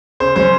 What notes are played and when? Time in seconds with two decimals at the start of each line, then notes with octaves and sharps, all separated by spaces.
0.20 C#3 C5
0.36 F#3 C#4 C5